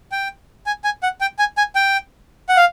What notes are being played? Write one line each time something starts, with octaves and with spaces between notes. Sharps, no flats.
G5
G#5
G#5
F#5
G5
G#5
G#5
G5
F#5
F5